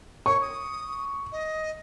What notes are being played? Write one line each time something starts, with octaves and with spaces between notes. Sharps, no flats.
C#5 C#6
D#6
D#5